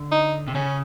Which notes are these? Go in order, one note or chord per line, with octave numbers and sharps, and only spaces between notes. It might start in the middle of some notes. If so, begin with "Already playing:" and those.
Already playing: D3
D#4
C3
C#3 C#4